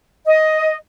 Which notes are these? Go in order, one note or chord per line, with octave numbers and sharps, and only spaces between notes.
D#5